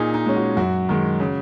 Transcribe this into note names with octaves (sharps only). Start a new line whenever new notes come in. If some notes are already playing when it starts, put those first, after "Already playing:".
Already playing: A#2 D#4 G#4
D#4
G#3 C#4
F#4
F#2 F#4
D#3 G#3
C#3